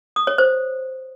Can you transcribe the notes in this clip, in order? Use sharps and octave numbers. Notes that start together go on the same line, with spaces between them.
D#6
C#5
C5